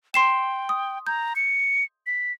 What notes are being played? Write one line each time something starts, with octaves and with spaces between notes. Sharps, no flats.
G5 C6 C7 E7
D#6
A#5 G6
C#7
B6